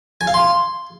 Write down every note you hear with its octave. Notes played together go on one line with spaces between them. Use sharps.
G#5
F5
C6